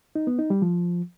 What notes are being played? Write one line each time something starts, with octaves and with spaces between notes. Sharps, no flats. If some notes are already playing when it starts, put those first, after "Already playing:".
D#4
B3
D#4
G3
F3